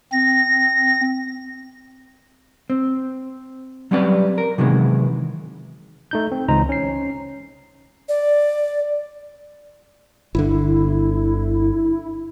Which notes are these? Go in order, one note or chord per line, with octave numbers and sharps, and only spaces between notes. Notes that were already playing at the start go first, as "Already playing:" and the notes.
C4 A#6
C4
F#3 G3 C4 C#4 B4 D5
A#4
C3 D#3 E3 F#3 G#3 B3
A3 D#4 G6
C4
C#2 E3 D#4 C5 A#5
C#4 C7
D5
G1 D3 E4